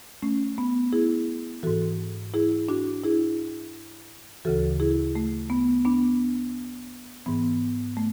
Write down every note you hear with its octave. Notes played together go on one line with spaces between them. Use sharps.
A3 C#4
B3
E4 G#4
G#2 E3 F#4 A4
E4 G#4
D4 F#4
E4 G#4
D2 C#3 E3 F#4 A4
E4 G#4
A3
B3
B3 D4
G#2 E3 B3
A3